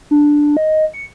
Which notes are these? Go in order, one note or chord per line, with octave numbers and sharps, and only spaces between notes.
D4
D#5
C#7